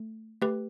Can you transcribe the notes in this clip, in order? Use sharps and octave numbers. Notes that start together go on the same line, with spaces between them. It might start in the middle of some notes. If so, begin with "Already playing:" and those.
Already playing: A3
A3 G4 B4